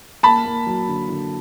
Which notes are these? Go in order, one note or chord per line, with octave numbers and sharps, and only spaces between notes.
A#3 A5 B5
A#3
F#3
D3
D3